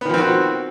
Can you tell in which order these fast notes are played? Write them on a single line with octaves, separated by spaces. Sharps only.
B3 D#3 F3 C4 F#4